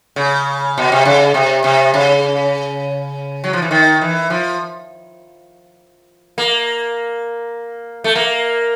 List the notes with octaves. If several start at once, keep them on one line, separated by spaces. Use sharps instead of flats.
C#3
B2
C3
C#3
C3
C3
C#3
F#3
F3
E3
D#3
E3
F3
A#3
A3
A#3